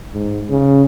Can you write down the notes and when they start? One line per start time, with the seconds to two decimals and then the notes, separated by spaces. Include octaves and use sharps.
0.14 G#2
0.50 C#3